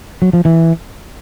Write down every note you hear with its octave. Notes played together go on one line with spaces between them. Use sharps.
F#3
F3
E3